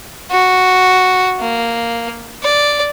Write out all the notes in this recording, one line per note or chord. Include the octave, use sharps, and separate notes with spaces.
F#4
A#3
D5